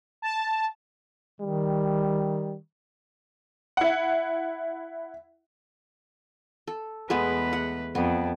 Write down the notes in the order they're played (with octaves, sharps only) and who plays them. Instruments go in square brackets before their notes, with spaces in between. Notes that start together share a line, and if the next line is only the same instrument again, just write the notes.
[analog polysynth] A5
[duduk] D#3 [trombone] G3
[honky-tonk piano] E4 F#5
[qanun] A4
[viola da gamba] E2 B4 [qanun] G#3 A3 B3
[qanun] F#5
[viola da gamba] F2 [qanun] B3